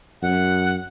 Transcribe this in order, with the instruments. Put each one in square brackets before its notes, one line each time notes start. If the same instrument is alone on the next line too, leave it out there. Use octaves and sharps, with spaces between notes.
[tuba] F#2 [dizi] F#5